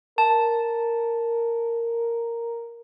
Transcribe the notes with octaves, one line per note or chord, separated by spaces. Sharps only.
A#4 A5